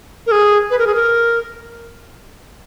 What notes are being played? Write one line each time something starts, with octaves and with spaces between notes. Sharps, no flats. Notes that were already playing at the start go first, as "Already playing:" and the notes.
A#4
G#4
B4
A#4
G#4
A#4